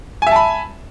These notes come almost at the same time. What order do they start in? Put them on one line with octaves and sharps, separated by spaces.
G#5 E5 A5 B5